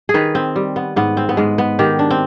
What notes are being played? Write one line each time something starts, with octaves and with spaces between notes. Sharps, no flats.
G#4
D#3 B4
C4
G3
B3
G#2 B3
C4
B3
G#2 G#3
B3
D#3 G4
D4
C4